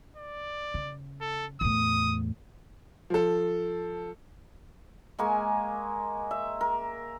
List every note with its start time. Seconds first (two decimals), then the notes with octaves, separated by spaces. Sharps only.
0.17 D5
0.74 C#3
1.21 A4
1.61 E2 A2 D#6
3.10 F3 A4
5.19 G#3 A#3 G#5 C#6
6.31 E5
6.61 A#4